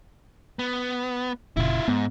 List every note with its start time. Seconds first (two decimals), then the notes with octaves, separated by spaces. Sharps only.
0.59 B3
1.57 F1 A#2 C#3 E4 F4
1.88 G#2 B3